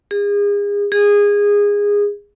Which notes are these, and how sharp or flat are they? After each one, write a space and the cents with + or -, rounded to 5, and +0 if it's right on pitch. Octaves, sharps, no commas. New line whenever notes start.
G#4 -35
G#4 -20